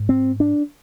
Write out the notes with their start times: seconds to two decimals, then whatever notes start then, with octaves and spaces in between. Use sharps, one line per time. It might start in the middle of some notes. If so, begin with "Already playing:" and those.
Already playing: G#2
0.09 C4
0.40 D4